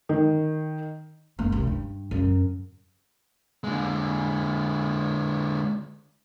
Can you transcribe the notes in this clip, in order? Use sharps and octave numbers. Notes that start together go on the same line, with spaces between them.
D#3
F#1 A#3
C2
G2
F#2 C#3
D3 G#3